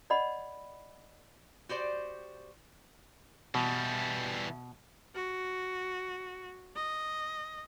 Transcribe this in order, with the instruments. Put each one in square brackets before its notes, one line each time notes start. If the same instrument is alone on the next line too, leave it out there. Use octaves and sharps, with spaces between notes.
[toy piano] D5 D#5 F#5 B5
[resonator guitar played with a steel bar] F#4 G4 C5 D5
[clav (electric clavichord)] B2 [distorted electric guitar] E3 G3
[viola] F#4
D#5